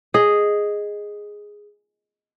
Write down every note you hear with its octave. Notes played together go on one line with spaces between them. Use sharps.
G#4 D#5